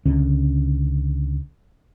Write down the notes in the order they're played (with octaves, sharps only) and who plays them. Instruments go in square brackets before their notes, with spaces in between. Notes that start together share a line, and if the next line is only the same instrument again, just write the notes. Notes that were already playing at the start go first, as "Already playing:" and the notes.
[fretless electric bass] C#2 D3 C#4